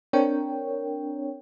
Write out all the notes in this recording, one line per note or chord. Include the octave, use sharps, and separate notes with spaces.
C4 D4 A#4 C#5 G5